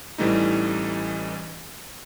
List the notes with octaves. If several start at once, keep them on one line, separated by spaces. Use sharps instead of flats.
A1 E3 G3 A3 D#4